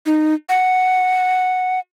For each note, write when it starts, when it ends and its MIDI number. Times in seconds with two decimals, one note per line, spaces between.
0.06 0.34 63
0.49 1.79 78